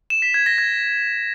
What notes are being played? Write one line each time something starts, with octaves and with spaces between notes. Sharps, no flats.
E7
B6
G#6
A#6
G#6